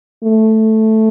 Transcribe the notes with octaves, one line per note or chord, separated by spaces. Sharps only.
A3